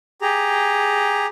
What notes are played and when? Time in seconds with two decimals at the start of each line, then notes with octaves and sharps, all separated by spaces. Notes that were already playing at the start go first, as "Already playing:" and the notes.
0.22 G4 G#4 A#5